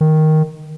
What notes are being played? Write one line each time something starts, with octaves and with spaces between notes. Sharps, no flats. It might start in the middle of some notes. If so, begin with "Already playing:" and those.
D#3